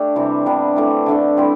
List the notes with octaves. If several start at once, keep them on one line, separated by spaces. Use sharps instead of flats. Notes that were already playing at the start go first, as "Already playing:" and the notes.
Already playing: A3 D4 G4
C3 E3 G3
C3 G3 B3 D4
E3 A3 D4
D3 A3 D4 A4
G3 C4 E4 A4